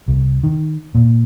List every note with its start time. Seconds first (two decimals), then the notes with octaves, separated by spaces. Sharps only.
0.08 C2
0.44 D#3
0.95 A#2